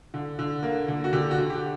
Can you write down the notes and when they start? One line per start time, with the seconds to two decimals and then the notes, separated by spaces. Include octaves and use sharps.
0.14 D3
0.39 D3
0.63 A#3
0.88 D3
1.04 F#4
1.13 D3 G4
1.31 F#4
1.38 D3
1.50 G4